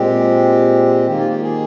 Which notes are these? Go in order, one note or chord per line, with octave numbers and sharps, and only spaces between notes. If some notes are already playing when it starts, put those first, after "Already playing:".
Already playing: A#2 G#3 C4 G4
D#3 A#3 G4
F4
G4
G#4